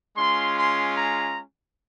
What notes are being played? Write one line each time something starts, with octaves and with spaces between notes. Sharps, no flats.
G#3 C#4 F4 C6
C6
A#5